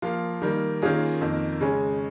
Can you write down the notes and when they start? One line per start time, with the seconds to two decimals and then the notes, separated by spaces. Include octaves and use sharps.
0.02 F3 A#3 F4
0.42 D#3 G3 A#3
0.82 D#3 A#3 C#4 F4 G#4
1.21 F2 D#3 A#3
1.61 C#3 G#3 C#4